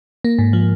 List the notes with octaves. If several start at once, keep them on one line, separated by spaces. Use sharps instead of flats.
A#3
G#2
F3